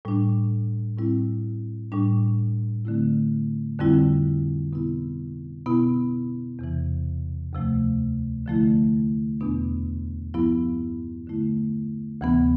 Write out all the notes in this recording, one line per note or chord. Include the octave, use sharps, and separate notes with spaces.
A2 G3 D4
A2 G3 C4 E4
A2 G3 D4
D3 A3 C4 E4
F2 D3 G3 C4 E4
B2 B3 E4
B2 B3 E4
E2 C3 E3
D2 C3 F3 A3
D3 F3 A3 E4
E2 B2 B3 D4
G2 F3 B3 E4
D3 A3 E4
D2 C3 E3 B3